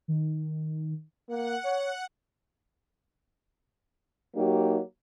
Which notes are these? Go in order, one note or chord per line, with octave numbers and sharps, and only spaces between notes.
D#3
A#3 F#5
C#5
F#3 A#3 D#4 G4